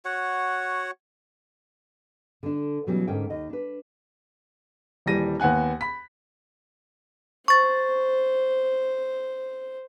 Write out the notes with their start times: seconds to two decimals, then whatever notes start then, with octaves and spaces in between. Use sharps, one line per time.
0.05 F#4 C#5 F#5
2.43 D3 D4
2.87 B2 E3 F#3 G3 C#4
3.07 G#2 D3 A3 A#3 C#4 G5
3.30 D#2 D#5
3.49 D4 B4
5.06 D#1 E3 G3 A#6 D#7
5.40 D#2 B3 F#5 G#5 F#6
5.81 B5 B6
7.48 C5 C#6 A6